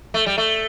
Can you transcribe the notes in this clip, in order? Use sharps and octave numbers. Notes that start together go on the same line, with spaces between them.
A3
G3
A3